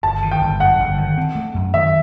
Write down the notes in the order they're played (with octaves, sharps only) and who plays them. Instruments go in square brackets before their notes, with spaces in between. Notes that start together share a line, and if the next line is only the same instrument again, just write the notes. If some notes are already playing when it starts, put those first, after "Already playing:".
[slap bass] G1 [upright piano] A5
[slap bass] D#3
[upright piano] G5
[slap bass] G1
[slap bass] F#2 [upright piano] F#5
[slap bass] G1
D#3
C4
A3
F#2
[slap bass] D#3 [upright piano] E5